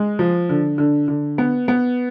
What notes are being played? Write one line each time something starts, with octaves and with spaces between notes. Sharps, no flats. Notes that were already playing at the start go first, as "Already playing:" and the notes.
Already playing: G#3
F3
D3
D3
D3
B3
B3